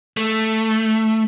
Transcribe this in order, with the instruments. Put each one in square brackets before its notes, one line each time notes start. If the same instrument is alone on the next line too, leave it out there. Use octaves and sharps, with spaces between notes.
[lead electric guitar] A3